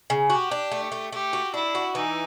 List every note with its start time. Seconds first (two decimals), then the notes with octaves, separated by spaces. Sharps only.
0.10 C#3
0.30 F#4 G4
0.52 D4
0.72 A3
0.92 A3
1.13 A3 G4
1.33 F#4
1.54 D4 E4
1.75 F#4
1.95 E3 D#4